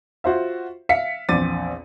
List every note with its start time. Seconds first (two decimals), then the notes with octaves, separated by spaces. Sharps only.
0.24 F4 F#4 C5 E5
0.89 E5 F5 B6 C#7
1.29 A#1 E2 C4 D6 A6 D#7